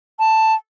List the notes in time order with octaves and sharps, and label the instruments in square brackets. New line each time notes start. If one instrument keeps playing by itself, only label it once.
[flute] A5